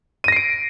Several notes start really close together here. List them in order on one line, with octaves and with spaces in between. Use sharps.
D#7 A#6 C7 D7